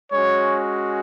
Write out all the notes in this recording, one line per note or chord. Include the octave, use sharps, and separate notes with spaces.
G#3 C#4 F#4 C#5